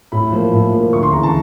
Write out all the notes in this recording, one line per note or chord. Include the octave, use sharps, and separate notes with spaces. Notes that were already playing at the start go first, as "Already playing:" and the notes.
A2 B5
F3 A#3
A2
F3 A#3
D2 C#6
C6
C#3 E3 A#5
A5